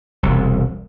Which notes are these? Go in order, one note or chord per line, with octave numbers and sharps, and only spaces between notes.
E1 C2